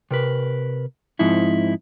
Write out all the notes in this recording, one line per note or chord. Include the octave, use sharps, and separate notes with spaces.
C3 A#4 B4
G#2 F3 C4 D#4 E4